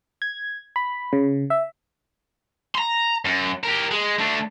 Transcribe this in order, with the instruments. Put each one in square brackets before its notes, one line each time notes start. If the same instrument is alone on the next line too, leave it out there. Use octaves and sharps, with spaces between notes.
[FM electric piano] G#6
B5
C#3
E5
[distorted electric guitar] A#5 C6
F#2
G4 A#4
G#3
A3 D4